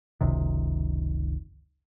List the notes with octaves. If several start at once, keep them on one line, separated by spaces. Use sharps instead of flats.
F#1 C#2 C3 D#3